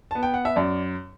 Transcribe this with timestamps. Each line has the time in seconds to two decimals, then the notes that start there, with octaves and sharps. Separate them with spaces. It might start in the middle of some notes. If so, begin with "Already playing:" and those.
0.11 B3 A5
0.23 G5
0.34 F#5
0.45 E5
0.56 F#2 D5